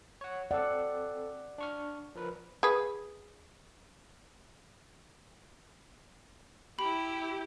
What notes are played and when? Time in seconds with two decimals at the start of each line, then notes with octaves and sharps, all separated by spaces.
0.21 C#5 F#5
0.51 C4 A4 D5 F#5
1.58 D4 C#6 F6
2.15 F3 A#4 B4
2.63 G#4 B4
6.79 E4 G4 B5